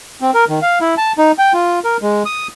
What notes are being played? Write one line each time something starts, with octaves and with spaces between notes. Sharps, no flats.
C4
A#4
D#3
F5
E4
A5
D#4
G5
F4
A#4
G#3
D#6